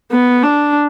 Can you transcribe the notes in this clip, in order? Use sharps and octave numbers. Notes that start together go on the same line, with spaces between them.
B3
D4